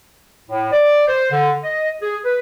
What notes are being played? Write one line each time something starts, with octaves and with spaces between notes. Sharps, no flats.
A2
D5
C5
D3
D#5
G#4
B4